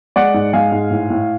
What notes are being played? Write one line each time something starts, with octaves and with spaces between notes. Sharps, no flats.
G#3 D5 F#5
G#2
G#3 F5 G#5
G#2
A2
A2